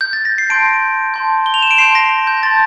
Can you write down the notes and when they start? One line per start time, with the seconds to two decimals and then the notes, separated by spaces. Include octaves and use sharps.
0.01 G6
0.13 A6
0.25 A#6
0.38 C7
0.50 A5 C6 G6 D7
1.14 A5 C6 G6
1.46 G7
1.54 F7
1.62 E7
1.71 D7
1.78 A5 C6 G6 C7
1.95 A#6
2.27 G6
2.43 A5 C6 G6 A6